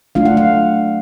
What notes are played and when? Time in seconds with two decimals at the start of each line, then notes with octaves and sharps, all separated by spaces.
0.15 F#3 A3 D4 F4 F5
0.26 F#5
0.37 F5